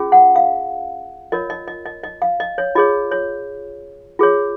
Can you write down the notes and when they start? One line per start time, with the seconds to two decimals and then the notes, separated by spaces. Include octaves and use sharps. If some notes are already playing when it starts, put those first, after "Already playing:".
Already playing: C#4 F4 G#4
0.12 F#5
0.36 F5
1.32 F4 A#4 C#5 D#5
1.50 D#5
1.67 D#5
1.86 D#5
2.04 D#5
2.22 F5
2.40 D#5
2.58 C#5
2.75 F4 G#4 C#5 D#5
3.11 C#5
4.19 F4 G#4 C#5